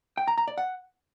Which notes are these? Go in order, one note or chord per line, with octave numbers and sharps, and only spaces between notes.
G5
A#5
A#5
D5
F#5